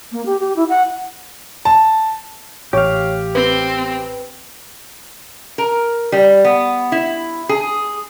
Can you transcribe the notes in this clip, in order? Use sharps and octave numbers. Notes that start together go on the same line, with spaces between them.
A#3
G4
G4
E4
F#5
A5
A1 G4 C#5 F5
C4 B4
A#4
G3
B3
E4
G#4